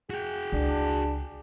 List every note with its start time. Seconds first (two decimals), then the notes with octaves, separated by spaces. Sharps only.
0.10 F#4 G#4 G5
0.52 C#2 D4